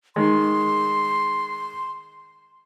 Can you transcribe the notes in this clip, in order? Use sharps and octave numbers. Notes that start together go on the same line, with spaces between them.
D#3 G#3 C6